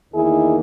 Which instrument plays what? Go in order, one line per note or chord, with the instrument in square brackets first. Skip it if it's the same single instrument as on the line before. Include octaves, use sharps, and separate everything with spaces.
[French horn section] E2 D#3 A#3 D#4 E4 G#4